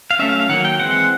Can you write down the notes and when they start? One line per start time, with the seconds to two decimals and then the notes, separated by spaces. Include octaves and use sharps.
0.11 F5
0.19 F#3 A3 C#4 E5
0.29 F5
0.40 F5
0.49 D#3 F#3 A#3 F#5
0.65 G5
0.79 E3 G#3 C4 F#5